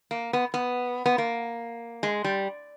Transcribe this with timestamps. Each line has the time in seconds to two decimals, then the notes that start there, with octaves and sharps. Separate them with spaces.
0.11 A#3
0.33 B3
0.54 B3
1.06 B3
1.18 A#3
2.03 G#3
2.24 G3